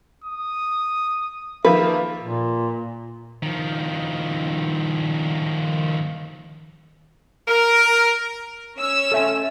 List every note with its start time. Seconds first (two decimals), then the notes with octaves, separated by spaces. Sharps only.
0.24 D#6
1.65 D#3 F3 A#3 B4 E5
2.21 A#2
3.43 D#3 F3
7.48 A#4
8.78 C#4 C#5 E6
9.12 A4 E5 G#5